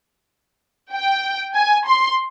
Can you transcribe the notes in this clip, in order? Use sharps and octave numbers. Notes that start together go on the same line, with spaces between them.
G5
G#5
C6